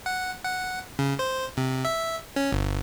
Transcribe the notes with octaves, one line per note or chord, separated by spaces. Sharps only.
F#5
F#5
C#3
C5
C3
E5
C#4
G1